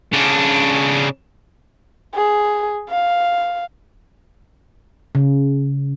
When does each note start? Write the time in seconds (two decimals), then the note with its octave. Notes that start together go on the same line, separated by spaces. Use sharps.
0.13 C#3 D4
2.15 G#4
2.90 F5
5.15 C#3